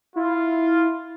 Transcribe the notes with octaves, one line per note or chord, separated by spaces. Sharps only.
E4 F4